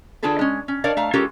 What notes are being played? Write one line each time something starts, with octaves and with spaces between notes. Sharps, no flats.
D3 D4 F4 G#4 A4 B4
G#3 C#4
C#4
D4 A#4 C#5 D5 F5
A3 F5 A#5
G#3 C#4 F4 G4 A4 A#4